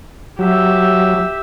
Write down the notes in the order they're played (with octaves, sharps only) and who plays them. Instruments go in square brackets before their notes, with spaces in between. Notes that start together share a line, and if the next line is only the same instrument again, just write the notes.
[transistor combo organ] F#3 [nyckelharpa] G4 E5